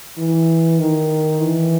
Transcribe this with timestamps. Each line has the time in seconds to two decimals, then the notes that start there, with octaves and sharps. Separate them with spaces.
0.18 E3
0.79 D#3
1.41 E3